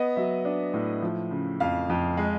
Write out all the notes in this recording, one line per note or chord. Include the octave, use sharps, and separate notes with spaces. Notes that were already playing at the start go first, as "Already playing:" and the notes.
Already playing: B3 D#5
F#3 E5
D4
A2
F3
C#3
F2 F5
F2
G#3